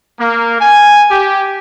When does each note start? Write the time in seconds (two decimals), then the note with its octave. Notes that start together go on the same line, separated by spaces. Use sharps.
0.20 A#3
0.60 G#5
1.09 G4